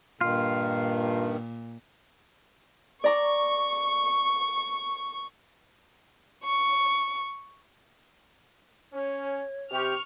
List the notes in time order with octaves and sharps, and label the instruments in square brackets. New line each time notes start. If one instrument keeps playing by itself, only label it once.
[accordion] G2 D#3 [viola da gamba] A#2 [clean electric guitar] F4
[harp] D5 A#5 D6 [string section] C#6
[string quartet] C#6
[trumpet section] C#4 [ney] C#5
[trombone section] C3 G4 [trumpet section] C#6 [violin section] F6